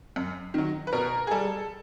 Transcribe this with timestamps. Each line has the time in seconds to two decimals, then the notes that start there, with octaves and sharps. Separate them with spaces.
0.16 F#2
0.54 D#3 F#3
0.87 B4
0.93 B2 A#4
1.27 G#4
1.31 G3 A4